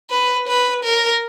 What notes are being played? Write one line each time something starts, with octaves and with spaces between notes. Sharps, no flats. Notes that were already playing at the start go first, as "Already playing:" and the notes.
B4
B4
A#4